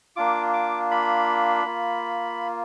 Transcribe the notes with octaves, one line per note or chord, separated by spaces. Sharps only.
A#3 D4 F4 D6
D6
B5
A#3 F4